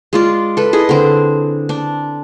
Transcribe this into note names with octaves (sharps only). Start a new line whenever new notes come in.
G#3 F4 D5
A4 B4
E4 G#4 D#5
D3 C4
D4